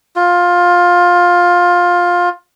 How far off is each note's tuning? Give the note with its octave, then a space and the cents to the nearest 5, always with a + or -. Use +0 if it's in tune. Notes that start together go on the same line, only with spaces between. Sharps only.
F4 +15